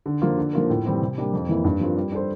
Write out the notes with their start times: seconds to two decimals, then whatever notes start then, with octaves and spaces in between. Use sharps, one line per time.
0.06 D3
0.22 F3 A#3 F4
0.37 D3
0.53 F3 A#3 F4 A#4
0.70 A2
0.85 E3 G3 C4
1.01 C3
1.18 G3 A#3 D4 G4
1.33 F2
1.49 E3 A#3 E4
1.64 G2
1.81 F3 C4 F4 A#4
1.97 G3
2.12 D4 A4 C5